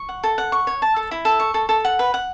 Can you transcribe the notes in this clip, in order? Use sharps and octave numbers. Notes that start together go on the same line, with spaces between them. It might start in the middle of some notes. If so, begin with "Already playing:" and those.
Already playing: C#6
F#5
A4
F#5
C#6
C#5
A5
A4
E4
A4
C#6
A4
A4
F#5
B4
F#5